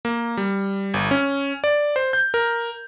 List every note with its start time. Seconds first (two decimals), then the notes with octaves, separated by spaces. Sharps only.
0.05 A#3
0.37 G3
0.94 G1
1.11 C#4
1.64 D5
1.96 C5
2.13 G6
2.34 A#4